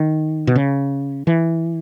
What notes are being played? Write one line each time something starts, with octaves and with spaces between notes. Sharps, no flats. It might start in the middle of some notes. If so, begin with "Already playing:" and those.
Already playing: D#3
B2
C#3
E3